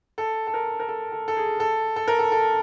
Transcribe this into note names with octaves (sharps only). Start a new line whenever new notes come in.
A4
A4
A#4
A#4
A4
A4
A4
G#4
A4
A4
A#4
A4
A4